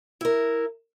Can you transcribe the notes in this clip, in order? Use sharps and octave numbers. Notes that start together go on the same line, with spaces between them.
E4 A#4